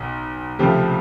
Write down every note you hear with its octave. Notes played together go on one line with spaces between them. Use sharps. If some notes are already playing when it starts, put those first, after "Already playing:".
Already playing: B1 B2
C#2 C3 F3 A3 G4